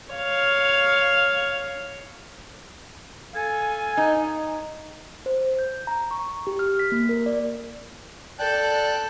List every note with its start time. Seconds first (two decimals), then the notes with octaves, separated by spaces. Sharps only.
0.13 C#5 F5
3.34 A4 F5 G#5
3.97 D#4
5.26 C5
5.59 G6
5.87 A#5
6.11 C#6
6.47 G4
6.59 F6
6.79 B6
6.92 A#3
7.09 A#4
7.26 D5
8.39 A4 D5 G5 F#6